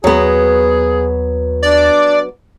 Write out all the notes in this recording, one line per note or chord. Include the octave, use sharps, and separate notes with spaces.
D#2 F#3 B3 G#4
D4 D5